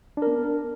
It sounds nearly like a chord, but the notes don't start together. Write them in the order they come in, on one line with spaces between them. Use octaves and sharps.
D4 A#4 B3